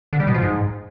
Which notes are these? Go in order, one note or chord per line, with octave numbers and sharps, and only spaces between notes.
D3
G3
B2
F3
G#2